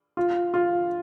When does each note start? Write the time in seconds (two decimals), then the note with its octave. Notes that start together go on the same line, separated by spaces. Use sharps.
0.17 F4
0.54 F4